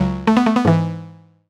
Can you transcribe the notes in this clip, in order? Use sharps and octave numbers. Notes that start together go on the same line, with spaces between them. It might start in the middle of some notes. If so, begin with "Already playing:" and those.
Already playing: C#2 C#3 F#3
A3
B3
A3
B3
G#2 E3